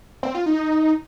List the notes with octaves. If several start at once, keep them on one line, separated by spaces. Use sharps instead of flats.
C4
F4
D#4